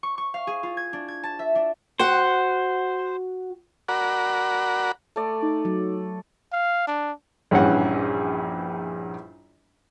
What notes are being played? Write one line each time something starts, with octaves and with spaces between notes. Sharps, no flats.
C#6
C#6
F5
G#4
F4
G#6
D4
G#6
A5
E5
D4
F#4 C5 F#5
F#4 A#4 D5 F#5 B5
A3 D5
D#4 D6
F#3
F5
D4
A#1 G2 E3 C#4 F#5